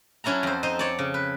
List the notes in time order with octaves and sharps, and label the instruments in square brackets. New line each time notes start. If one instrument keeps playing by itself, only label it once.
[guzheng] F#3 C#4 E4 A4 A#5
F2 C5
D#4 C5 D#5
C#5 D5
C#3
B4